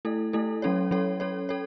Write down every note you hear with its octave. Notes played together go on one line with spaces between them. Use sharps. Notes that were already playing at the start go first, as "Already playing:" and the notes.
A3 E4 A4
A3 E4 A4
F#3 C#4 A4 C#5
F#3 C#4 A4 C#5
C#4 A4 C#5
A4 C#5